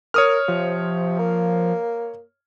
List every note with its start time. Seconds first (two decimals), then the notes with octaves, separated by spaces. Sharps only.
0.14 A#4 C#5 D#6 F6
0.48 C3 F3
1.19 A#3